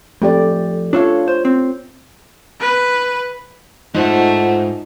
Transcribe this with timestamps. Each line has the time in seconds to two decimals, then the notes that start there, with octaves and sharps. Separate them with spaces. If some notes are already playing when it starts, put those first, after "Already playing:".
0.22 F2 A3 G4 D5
0.93 D4 F4 A4 C#5 F5
1.28 C5
1.45 C4
2.60 B4
3.94 G#2 A3 D#4 F4 C5 F#5